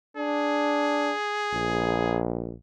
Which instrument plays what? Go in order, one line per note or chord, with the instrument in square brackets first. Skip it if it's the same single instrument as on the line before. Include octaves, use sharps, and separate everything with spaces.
[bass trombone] D4 [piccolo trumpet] G#4
[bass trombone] A#1